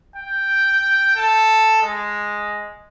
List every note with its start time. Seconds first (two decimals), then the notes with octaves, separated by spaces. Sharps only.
0.16 G5
1.16 A4
1.82 G#3